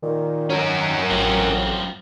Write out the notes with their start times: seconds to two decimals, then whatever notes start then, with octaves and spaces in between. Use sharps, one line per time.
0.02 A#2 D#3
0.50 F#3 C#4 A#4
1.11 A1 F#2 F3 C4